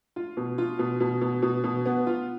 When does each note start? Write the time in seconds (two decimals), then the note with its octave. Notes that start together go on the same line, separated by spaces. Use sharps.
0.16 F4
0.37 B2
0.58 F4
0.79 B2
1.00 B2
1.21 B2
1.42 B2
1.64 B2
1.86 B3
2.07 F4